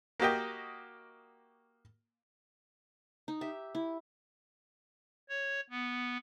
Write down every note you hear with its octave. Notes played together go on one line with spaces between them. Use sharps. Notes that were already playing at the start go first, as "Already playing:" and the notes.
A#3 F#4 G4 D#5 G5
D#4
G4 E5
E4
C#5
B3